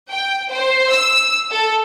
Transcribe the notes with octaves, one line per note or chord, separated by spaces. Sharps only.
G5
C5
E6
A4